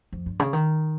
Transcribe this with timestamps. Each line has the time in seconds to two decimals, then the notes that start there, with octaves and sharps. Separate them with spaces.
0.12 F2
0.26 G2
0.39 C#3
0.53 D#3